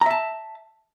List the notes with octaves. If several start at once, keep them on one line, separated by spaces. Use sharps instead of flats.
E5 A5 A#5